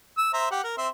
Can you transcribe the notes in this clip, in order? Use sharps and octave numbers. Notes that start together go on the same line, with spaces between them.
E6
C5 E5 A#5
G4 F#5
A#4
C4 E5 C6